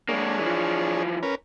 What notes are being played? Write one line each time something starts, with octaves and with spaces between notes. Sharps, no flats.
G#3 A#3 D4 G#4 C#5
E3 F3
C#4 A#4 B4